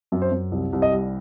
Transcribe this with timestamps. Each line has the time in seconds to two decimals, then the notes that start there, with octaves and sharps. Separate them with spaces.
0.12 F#2
0.22 C5
0.32 F#2
0.52 C2
0.73 C2
0.82 D#5
0.92 G3